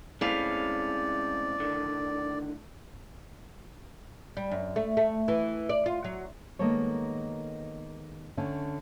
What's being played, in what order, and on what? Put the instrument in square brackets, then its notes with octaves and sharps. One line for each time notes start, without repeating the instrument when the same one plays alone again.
[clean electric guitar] G#3 C4 C#4 [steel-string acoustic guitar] A3 E4 F5 [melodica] D5
[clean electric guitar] D3 D#3
[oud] G3
F#2
A3
A3
E3
D5
F4
F#3
[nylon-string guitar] D#3 G#3 A#3 B3 A4 C#5
D3 A3 C#4